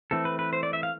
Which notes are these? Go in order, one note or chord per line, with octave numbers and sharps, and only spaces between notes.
E3 A3 C4 A4
B4
B4
C5
D5
E5
F5